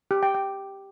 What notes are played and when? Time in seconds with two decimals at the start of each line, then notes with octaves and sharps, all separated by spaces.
0.11 G4
0.23 G5
0.35 G5